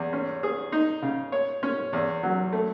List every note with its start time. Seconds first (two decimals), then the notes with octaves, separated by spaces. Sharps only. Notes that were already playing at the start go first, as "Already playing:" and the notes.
Already playing: E2
0.13 C#4
0.43 G#4
0.72 D#4
1.02 C#3
1.32 C#5
1.63 C#4
1.93 E2
2.23 F#3
2.52 A3